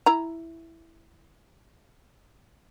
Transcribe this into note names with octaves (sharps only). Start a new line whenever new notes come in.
E4 A#5